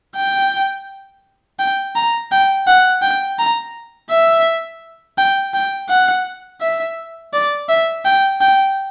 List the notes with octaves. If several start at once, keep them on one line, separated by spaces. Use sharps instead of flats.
G5
G5
A#5
G5
F#5
G5
A#5
E5
G5
G5
F#5
E5
D5
E5
G5
G5